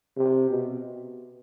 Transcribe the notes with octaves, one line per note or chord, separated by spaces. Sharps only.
C3
B2